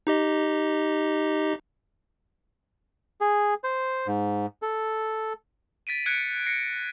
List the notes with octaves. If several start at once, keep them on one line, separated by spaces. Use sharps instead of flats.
D#4 G4 D#5
G#4
C5
G#2
A4
A6 B6 D7 D#7
F#6 G#6 B6 C#7 D7
A#6 C7 C#7